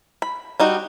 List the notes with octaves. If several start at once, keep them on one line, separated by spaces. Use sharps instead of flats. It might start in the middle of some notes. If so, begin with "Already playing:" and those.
B5
G3 D#4 F#4